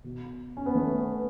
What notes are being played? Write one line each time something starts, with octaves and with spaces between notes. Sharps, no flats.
B2
C#4
B3
A3
B3